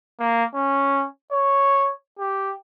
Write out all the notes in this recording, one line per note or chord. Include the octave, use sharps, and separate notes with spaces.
A#3
C#4
C#5
G4